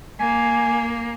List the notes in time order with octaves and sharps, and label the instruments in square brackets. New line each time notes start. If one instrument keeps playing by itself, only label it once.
[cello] A#3 [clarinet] G#5